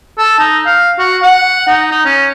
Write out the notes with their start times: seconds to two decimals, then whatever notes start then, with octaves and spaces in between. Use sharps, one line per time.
0.18 A4
0.39 D#4
0.66 F5
0.99 F#4
1.22 F#5
1.68 D#4
1.91 D#4
2.05 C#4